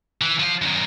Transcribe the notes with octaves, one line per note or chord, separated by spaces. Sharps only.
E3
F3 F4
F#2 D#3